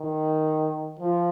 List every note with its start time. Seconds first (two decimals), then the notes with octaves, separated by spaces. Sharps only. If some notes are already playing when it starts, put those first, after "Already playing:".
Already playing: D#3
1.00 F3